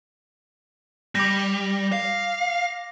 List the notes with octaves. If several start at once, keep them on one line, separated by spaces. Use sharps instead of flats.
G3 D6 A#6
F5